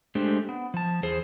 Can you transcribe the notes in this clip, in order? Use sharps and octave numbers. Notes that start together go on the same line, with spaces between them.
G#3 A3 D4 G4 C5
B3
F3 A5
E2 G#4 C5